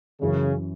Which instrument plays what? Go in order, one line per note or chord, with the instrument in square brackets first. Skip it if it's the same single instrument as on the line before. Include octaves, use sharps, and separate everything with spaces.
[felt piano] F#2 E3 C#4 [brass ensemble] C#3